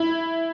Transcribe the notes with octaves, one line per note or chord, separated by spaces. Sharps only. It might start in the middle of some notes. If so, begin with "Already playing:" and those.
Already playing: E4